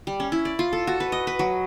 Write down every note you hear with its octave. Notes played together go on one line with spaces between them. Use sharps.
G3
C#4
E4
D5
F4
A4
F#4
B4
D#5
B4
F#3